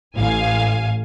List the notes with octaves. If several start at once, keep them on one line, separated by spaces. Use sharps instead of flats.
A1 F5 G#5